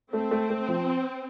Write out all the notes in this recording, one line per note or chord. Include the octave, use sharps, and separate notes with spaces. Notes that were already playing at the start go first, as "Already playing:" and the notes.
A3 C4
A3
A3
F3